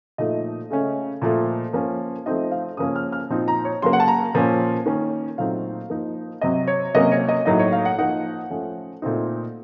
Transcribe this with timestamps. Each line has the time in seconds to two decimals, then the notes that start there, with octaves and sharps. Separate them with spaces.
0.18 A#2 F3 A3 D#4 D#5
0.70 C#3 A3 C#4
1.22 A#2 F3 A3
1.73 F3 A#3 C#4
2.26 F3 A3 C4 D#4 D#5
2.51 F5
2.77 C#3 F3 A#3 C#4 D#6
2.96 F6
3.13 F6
3.30 A#2 F3 C4 D#4
3.48 A#5
3.65 C#5
3.82 C#3 F#3 A#3 C6
3.93 F#5
4.00 A5
4.08 A#5
4.34 A#2 F3 A#3 C#4
4.86 D#3 A#3 C#4
5.38 A#2 F#3 A3 C4 D#4 F5
5.90 F3 A#3 D#4
6.41 C3 F#3 C4 D#5
6.68 C#5
6.95 C3 F#3 A#3 C#4 D#5
7.12 C#5
7.29 D#5
7.45 A2 F#3 A#3 D#4 D#5
7.59 C#5
7.72 F5
7.85 F#5
7.98 F3 A#3 D#4 F#5
8.50 F3 A3 C#4
9.02 A#2 A3 C4 D#4